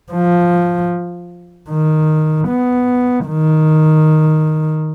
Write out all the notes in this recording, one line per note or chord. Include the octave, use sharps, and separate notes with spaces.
F3
D#3
B3
D#3